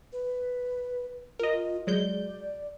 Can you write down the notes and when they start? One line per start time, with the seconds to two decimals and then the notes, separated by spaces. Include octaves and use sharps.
0.13 B4
1.39 F4 A#4 D#5
1.87 F#3 G#3 D5 G6